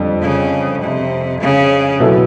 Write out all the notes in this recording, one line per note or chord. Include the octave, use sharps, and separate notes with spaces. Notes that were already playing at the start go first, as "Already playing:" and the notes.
Already playing: F2 D3 G3 C4
C#3
C3
C#3
B2 F#3 B3 E4 A4